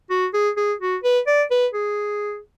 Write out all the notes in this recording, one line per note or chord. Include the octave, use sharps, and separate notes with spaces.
F#4
G#4
G#4
F#4
B4
D5
B4
G#4